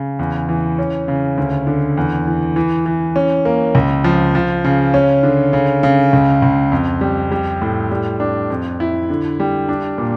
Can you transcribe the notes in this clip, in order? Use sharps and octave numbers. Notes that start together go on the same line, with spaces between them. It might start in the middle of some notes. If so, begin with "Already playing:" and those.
Already playing: C#3
E2
E3
C#4
C#3
D2
D3
E2
E3
E3
E3
C#4
A#3
C#2
F3
F3
C#3
C#4
D3
C#3
C#3
C#2
C#2
F2
G3
G3
A2
G3
D4
F2
E4
D3
G3
D4
A#2